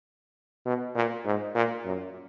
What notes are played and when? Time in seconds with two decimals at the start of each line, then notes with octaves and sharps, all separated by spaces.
0.66 B2
0.96 A#2
1.25 G#2
1.56 A#2
1.86 F#2